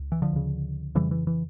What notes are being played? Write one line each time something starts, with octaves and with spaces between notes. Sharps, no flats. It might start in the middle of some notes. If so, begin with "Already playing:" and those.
Already playing: C#2
E3
D3 F3
D2 C#3
F2 C#3 E3 G3
E3
E3